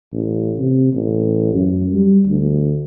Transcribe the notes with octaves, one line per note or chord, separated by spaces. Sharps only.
A1
C3
A1
F#2
G3
D2